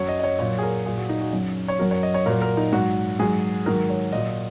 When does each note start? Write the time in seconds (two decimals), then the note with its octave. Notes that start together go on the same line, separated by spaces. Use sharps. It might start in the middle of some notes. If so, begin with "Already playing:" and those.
Already playing: F#2 F#3 C#5
0.08 D#5
0.19 D#5
0.24 C#5
0.39 A#2 F#3 C#5
0.59 G#4
0.63 A#4
0.86 A#2 F#3 G#4
0.98 F#4
1.09 D#4
1.21 F#4
1.33 F#2 F#3
1.68 C#5
1.79 F#2 F#3 A#4
1.91 C#5
2.03 D#5
2.14 C#5
2.26 A#2 F#3 A#4
2.42 A#4
2.57 D#4
2.73 G#2 F#3 F#4
3.19 G#2 F#3 G#4
3.66 G#2 D#3 F#3 A#4
3.90 C#5
4.12 A#2 F#3 D#5
4.28 D#5